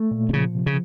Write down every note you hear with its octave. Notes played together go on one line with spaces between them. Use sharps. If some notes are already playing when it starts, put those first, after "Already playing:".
Already playing: A3
A#2
C3
C#3 F3
C3
C#3